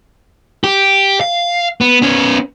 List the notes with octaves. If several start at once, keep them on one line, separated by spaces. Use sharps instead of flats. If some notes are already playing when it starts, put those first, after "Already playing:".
G4
F5
B3
B3 C#4